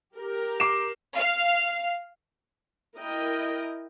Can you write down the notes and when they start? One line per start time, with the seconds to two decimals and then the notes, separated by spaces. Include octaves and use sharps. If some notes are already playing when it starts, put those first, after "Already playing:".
0.16 G4 A#4
0.60 D6 C7 E7
1.15 F5
2.96 E4 A#4 D#5 G5